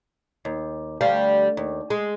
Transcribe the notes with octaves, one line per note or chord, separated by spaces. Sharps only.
D#2
D2 G3 F5
D#2
G#3